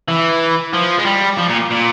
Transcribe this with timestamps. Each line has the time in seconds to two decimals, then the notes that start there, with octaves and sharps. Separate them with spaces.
0.08 E3
0.73 F3
0.99 G#3
1.05 G3
1.38 F3
1.49 A#2
1.70 A#2